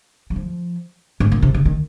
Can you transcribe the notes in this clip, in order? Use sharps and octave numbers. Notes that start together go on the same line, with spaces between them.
F#3
F3
G#2
A#2
C3
C#3
D#3